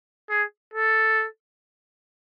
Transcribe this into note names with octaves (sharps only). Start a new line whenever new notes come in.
G#4
A4